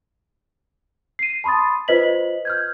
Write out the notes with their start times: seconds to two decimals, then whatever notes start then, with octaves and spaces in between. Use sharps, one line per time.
1.19 C7 D#7
1.44 A5 B5 C6 D#6 A6
1.88 F4 B4 C5 D#5 B6 F#7
2.45 F6 G6 G#6